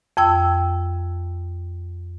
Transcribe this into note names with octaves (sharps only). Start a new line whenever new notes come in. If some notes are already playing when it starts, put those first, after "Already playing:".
F2 G5 E6